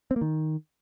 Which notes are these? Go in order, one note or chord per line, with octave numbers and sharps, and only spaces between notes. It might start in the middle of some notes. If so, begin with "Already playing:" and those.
C4
A#3
D#3